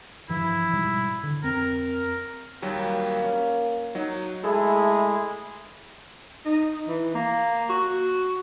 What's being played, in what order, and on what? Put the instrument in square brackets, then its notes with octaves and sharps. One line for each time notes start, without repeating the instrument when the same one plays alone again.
[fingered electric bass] G2 E3 F3 [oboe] E4
[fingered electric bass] G#2 B2 G3
D3
[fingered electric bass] F2 C4 [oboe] A#4
[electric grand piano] D#2 F#3 G3 [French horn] A#3
[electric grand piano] C#4
F#3 D#4 F#5
[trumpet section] G#3 E4 G#4 [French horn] A3 [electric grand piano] A4
[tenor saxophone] D#4
E3
A#3
F#4